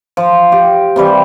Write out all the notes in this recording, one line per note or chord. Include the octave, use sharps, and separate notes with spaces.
F3
G4
C3 E3 G3